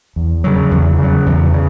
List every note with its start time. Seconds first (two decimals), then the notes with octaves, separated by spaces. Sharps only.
0.16 E2
0.44 C#3 F#3
0.71 E2
0.98 C#3 F#3
1.26 E2
1.53 C#3